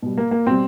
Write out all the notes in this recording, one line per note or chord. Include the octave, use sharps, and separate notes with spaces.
B2 G3
A#3
A#3
B2 G3 C4